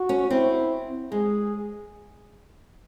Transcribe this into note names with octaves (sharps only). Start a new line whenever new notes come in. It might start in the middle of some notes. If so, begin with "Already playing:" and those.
Already playing: F#4
C#4
C4 E4
G#3 G#4